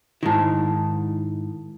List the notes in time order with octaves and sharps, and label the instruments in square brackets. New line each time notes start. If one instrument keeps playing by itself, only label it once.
[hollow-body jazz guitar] G#2 D#3 [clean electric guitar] E4 A5